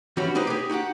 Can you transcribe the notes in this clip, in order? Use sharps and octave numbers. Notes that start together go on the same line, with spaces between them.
E3 G3 C#4 D4 F#4
B3 D#4 G4 B4 C5
G4 G#4
D#4 F#4 G4 F#5